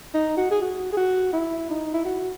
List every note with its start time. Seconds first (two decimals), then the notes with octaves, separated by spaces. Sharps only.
0.14 D#4
0.37 F#4
0.51 G#4
0.62 F#4
0.93 G#4
0.97 F#4
1.33 E4
1.70 D#4
1.94 E4
2.05 F#4